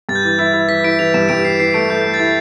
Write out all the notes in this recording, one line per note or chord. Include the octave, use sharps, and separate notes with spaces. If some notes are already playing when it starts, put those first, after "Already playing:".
G2 A6
G6
E3 A6
E4 A6
E4
E3 B6
E4 D7
E3 F7
G2 E7
G2 D7
E3 C7
E3 C7
A3 D7
A3 G6
A3
A6
E4 G6